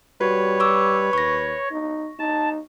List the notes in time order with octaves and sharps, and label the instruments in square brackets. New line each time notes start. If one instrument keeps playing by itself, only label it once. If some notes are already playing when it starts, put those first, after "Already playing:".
[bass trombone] G3 [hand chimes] F#4 [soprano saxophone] B4 [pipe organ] C#5
[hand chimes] C#6 D6 E6
[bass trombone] D#2 [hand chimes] C#6 A#6
[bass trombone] D#4
[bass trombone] D#4 [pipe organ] A5